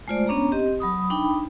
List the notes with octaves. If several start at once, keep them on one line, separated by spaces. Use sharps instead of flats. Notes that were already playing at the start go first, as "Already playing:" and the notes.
G#3 A3 F4 C5 D5
B3 C#4 D4 C#5 A#5
C4 G4 D#5
F#3 B5 D#6
D4 D#4 G5 B5